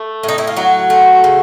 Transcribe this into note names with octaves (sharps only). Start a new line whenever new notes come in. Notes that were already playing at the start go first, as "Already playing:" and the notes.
Already playing: A3
A2
D#4
E4
F4
F#3 F#4
A3
C#3